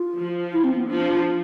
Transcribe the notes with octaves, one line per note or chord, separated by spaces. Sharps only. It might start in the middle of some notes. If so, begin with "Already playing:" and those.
Already playing: F4
F3
E4
C4
B3
F3 D4